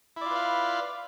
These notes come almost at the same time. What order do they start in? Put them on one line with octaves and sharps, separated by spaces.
E4 D5 F4 B4 F5